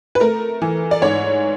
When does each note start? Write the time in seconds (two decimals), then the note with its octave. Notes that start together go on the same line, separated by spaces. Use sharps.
0.15 B4
0.20 A3 A#4
0.62 E3
0.91 D5
1.02 G#2 C#5